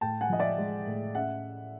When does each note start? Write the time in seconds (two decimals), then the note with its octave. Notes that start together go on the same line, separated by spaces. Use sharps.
0.01 A2 G5 A5
0.21 F#5 G#5
0.29 F3 D#5
0.39 D5 E5
0.58 G#3
0.87 A2
1.15 C#4 E5 F#5